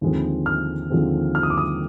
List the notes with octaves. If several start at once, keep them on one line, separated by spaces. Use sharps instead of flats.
D#2 D3 F3 G#3 C4
F6
D#2 D3 F3 G#3 C4
F6
D#6
D6
D#6